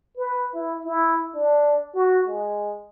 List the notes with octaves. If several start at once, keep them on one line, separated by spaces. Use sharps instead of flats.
B4
E4
E4
D4
F#4
G#3